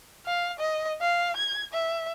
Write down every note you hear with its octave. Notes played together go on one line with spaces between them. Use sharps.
F5
D#5
F5
G#6
E5